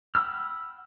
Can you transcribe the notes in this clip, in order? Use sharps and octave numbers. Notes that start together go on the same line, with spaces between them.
F#5 G5 B5 E6 F6